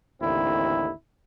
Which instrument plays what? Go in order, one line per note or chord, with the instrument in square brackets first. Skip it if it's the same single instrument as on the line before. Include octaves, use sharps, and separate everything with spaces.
[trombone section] A1 D#2 D3 C4 E4